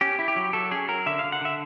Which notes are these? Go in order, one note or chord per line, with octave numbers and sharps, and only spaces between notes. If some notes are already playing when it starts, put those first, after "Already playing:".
C#4 G4
E4
G4
F#3
F#3 A4
C#4 G#4
F#3 A#4
D3 E5
D3 F5
F#5
D3 E5